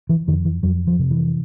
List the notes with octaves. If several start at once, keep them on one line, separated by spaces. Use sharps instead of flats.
E3
F2 D#3
E3
F2 F#3
F3
C3
E3